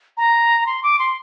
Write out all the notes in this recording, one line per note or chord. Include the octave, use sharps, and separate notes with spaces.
A#5
C6
D6
C6